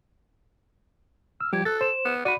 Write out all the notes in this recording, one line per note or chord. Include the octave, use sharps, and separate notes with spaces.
E6 F6
F3 G3 G4 G#6
A4 F#6 A6
C5 E7
B3
F#4 D5 B5 D#7